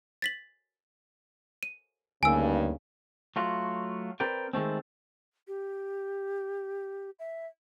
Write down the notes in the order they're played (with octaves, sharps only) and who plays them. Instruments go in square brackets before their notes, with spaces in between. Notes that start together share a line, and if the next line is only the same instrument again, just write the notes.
[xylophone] A6 B6 F#7
D#7
[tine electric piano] D2 A#3 [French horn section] G2 C#3 D#4 [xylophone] G#5 E6
[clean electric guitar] F#3 A3 F4 F#4
C4 A#4 B4 D5 G5
D#3 G#3 A3 C4
[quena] G4
E5